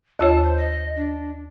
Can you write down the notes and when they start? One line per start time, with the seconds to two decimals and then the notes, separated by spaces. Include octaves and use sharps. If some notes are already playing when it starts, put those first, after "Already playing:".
0.19 D#2 F4 C#5 A5
0.44 C5
0.57 D#5
0.96 D4